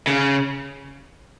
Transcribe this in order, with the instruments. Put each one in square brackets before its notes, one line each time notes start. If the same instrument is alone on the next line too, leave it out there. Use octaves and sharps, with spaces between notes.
[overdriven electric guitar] C#3